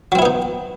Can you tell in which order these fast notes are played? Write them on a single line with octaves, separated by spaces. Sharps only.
F#3 C4 E4 B3 D#4